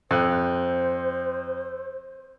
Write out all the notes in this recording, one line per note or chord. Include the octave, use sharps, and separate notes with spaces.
F2 C5 F#6